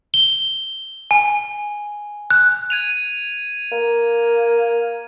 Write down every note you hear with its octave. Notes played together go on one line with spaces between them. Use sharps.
G7
G#5
F#6
G#6 D#7 F7
A#3